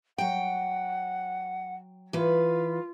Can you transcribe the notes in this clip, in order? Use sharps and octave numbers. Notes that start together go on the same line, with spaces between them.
F#3 F#5 G5
E3 F4 B4